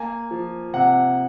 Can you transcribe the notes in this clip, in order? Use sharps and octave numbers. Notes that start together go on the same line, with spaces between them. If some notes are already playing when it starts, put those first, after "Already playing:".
Already playing: A#3 G#5
F3
C3 F#5